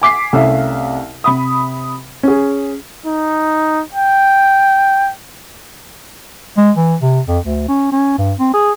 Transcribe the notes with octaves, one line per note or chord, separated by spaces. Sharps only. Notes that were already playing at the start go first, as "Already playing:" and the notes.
G#5 D6 B6 C7
C2 C3 A3 C#4 E5 F5
C3 B5 D#6
C#4 G#4
D#4
G5
G#3
E3
C3
F2
D2
C#4
C#4
G2
C4
G#4